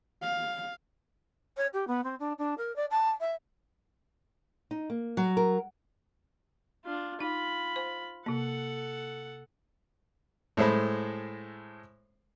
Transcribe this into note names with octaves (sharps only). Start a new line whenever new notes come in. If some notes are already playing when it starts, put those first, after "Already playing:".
F5
C#5
G4
B3
C4
D4
D4
A#4
D5
A5
E5
D#4
A#3
F#3
A#4
D4 F4
D#4 F4 B5
C5
C3 A#3 A4 F#5
A2 G#3 A4 C5 B5